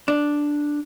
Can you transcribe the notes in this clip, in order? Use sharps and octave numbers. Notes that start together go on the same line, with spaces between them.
D4